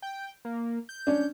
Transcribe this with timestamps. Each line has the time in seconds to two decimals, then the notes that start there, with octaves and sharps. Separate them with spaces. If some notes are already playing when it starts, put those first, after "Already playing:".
0.02 G5
0.45 A#3
0.89 G6
1.07 C#4 D4